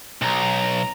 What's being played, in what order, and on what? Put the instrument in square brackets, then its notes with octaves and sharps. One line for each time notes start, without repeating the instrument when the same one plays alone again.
[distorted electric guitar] B1 [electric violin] A#5